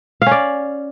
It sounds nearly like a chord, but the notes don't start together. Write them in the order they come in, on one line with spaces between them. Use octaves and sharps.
F5 C#4 D5